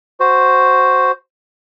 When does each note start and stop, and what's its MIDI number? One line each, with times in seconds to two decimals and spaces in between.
0.20 1.11 66
0.20 1.11 72